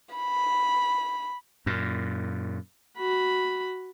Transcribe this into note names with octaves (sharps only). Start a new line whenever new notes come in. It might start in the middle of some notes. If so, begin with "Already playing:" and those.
B5
F#2 A#2
F#4 B5